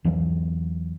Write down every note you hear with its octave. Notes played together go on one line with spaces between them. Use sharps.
E2 E3 F#3